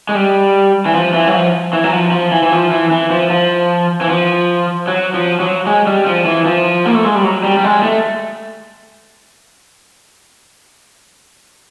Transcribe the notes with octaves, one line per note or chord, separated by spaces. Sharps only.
G#3
G3
E3
F3
E3
F#3
F3
E3
F#3
F3
F3
E3
E3
F3
E3
E3
F3
F3
E3
F3
F#3
F3
F#3
G#3
G3
F3
E3
F3
A#3
A3
G#3
G3
F#3
G3
G3
G#3
A3